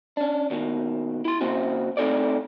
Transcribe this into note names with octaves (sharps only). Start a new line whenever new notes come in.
C#4 D4
D#2 B2 D3 D#3
E4 C6
C#3 A#3 C4 C#4 F#4
A3 C4 D#4 A4 C#5 D5